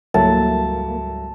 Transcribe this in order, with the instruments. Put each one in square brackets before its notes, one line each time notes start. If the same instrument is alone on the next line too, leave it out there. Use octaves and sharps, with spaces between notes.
[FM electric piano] C#2 G#2 G3 [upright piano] F#3 A3 E4 [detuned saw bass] A#3 [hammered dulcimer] A5